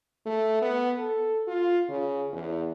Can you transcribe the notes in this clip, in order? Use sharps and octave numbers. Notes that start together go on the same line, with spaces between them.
A3
B3
A4
F4
C#3
E2